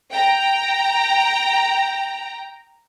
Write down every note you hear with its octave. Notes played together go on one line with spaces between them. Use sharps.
G5 A#5